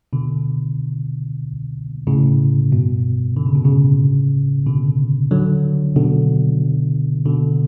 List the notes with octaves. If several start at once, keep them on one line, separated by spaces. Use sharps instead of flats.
B2 D3
A2 C#3
G2 B2
D3
C#3
B2
A2 C#3
B2 D3
D3 F#3
B2 D3
B2 D3